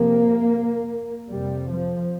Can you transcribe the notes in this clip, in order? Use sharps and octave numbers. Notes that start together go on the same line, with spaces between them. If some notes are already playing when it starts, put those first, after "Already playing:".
Already playing: F2 C3 A#3
F2 C3 G3
F3